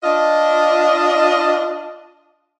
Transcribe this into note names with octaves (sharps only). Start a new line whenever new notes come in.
D4 F4 D#5